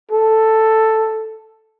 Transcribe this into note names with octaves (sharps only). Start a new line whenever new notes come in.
A4